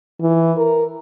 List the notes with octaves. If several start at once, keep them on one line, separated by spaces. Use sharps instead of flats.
E3
A#4